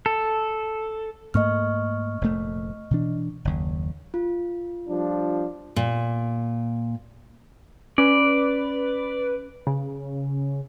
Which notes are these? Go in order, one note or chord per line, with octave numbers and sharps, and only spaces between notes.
A4
G#2 A3 A#3 D#5 C#6 F6
F1 A#2 A3
B2 E3 D4
F#1 D#2
F4
F3 G3 D4
A#2
C#4 B4 D5
C#3